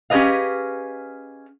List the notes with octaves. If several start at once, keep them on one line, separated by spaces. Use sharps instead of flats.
C#4 G4 G#4 B4 D#5 F5